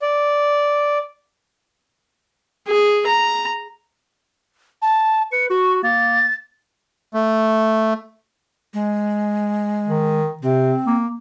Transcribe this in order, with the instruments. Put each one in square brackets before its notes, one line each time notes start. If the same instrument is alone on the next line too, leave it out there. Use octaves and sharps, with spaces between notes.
[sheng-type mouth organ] D5
[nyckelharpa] G#4
A#5
[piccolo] A5
[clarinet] B4 [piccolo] C#7
[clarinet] F#4 [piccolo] C#6
[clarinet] A#3 [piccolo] A6
[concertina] A3
[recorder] G#3
[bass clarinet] D#3
[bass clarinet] C3 [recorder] C4
[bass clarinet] A#3